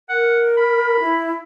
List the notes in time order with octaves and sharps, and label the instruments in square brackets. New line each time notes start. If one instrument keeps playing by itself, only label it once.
[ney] A#4 [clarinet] F#5
[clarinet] B5
[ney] E4